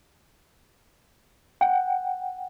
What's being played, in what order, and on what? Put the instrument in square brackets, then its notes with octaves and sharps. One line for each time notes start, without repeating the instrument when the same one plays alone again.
[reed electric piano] F#5 G5